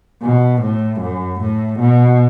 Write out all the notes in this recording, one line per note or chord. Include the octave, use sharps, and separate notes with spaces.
B2
A2
F#2
A2
B2